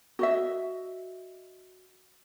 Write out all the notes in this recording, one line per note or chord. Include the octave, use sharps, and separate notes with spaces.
F#4 D#5 E5